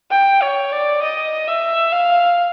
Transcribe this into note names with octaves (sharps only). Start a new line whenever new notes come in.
G5
C#5
D5
D#5
E5
F5